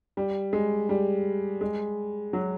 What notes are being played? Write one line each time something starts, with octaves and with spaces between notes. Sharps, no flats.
G3
G#3
G3
G#3
F#3